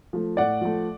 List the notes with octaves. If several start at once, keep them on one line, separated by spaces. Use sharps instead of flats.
F3 A3
A2 D5 F#5
F3 A3